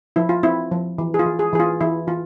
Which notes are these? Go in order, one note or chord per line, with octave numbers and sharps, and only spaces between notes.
F3 E4
F4
C4 E4
F3
E3
G#4
F4
E3
G#4
E3 G#4
F4
E3 E4
E3 F4